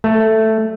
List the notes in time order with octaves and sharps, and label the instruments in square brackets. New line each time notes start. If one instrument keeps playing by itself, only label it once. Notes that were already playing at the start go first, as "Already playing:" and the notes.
[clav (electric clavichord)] A3